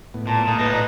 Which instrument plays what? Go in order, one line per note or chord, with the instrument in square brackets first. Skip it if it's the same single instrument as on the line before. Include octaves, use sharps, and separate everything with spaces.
[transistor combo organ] A2 B3
[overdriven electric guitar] A#2 [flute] A5
[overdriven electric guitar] A#2 [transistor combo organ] A3 A#3 D#6
[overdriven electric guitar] A2 D#4 [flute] B4
[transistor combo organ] B3 D5 D#5